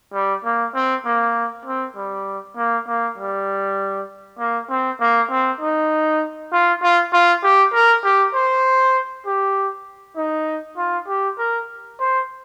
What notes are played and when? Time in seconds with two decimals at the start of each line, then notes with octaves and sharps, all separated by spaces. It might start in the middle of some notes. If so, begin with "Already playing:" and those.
0.13 G3
0.44 A#3
0.74 C4
1.05 A#3
1.65 C4
1.96 G3
2.57 A#3
2.87 A#3
3.18 G3
4.39 A#3
4.70 C4
5.00 A#3
5.30 C4
5.61 D#4
6.52 F4
6.82 F4
7.12 F4
7.43 G4
7.73 A#4
8.04 G4
8.35 C5
9.26 G4
10.16 D#4
10.77 F4
11.08 G4
11.38 A#4
11.99 C5